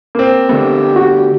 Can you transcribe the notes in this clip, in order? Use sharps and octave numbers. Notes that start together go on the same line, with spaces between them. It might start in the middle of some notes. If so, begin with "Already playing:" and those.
A#3 C4
D3 A3 B3 G4
F#4